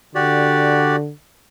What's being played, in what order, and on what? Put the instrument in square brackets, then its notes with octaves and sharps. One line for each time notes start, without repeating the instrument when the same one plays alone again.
[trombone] D3 [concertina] F#4 G4 D5